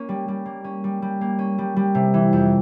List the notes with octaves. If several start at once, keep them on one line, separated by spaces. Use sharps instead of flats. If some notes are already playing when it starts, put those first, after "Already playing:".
Already playing: A#3 C#4
G3
G3
A#3
C#4
G3
G3
A#3
C#4
G3
G3
C3
E3
F2